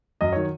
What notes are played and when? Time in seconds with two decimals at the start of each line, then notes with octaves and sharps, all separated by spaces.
0.21 F#2 D#5
0.33 D#3 F#3 C#5